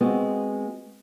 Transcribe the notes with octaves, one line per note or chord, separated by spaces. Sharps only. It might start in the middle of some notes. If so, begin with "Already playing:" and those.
G#3 B3 C4 F#4